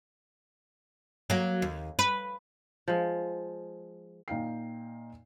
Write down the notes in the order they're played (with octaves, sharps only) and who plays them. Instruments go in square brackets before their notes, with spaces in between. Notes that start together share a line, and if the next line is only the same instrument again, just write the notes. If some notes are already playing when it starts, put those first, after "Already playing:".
[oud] F#3 A#3
D#2
B4
[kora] F3 G#3
[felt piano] A#2 D#4 F5 G5 C7